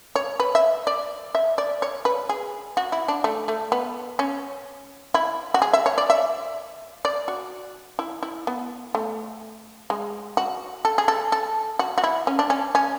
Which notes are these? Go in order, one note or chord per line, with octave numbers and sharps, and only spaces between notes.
C#5
B4
E5
D5
E5
D5
C#5
B4
G#4
F#4
E4
D4
A3
A3
B3
C#4
E4
F#4
G#4
E5
C#5
D5
E5
D5
F#4
E4
E4
B3
A3
G#3
F#4
A4
G#4
A4
A4
F#4
F#4
E4
C#4
D4
C#4
C#4